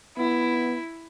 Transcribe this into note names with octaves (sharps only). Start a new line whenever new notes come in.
B3 E4